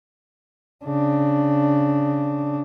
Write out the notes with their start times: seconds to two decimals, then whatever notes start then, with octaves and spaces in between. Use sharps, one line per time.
0.85 C#3 D4